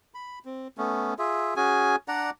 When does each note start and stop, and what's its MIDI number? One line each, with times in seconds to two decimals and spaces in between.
0.14 0.39 83
0.45 0.68 60
0.78 1.14 57
0.78 1.14 59
0.78 1.14 61
1.19 1.54 65
1.19 1.54 68
1.19 1.54 76
1.56 1.96 61
1.56 1.96 66
1.56 1.96 68
1.56 1.96 80
2.08 2.30 62
2.08 2.30 74
2.08 2.30 78
2.08 2.30 82